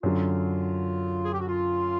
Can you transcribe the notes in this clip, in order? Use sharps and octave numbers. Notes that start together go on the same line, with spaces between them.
F#2 D3 F#3 F4
G#4
G4
F#4
F4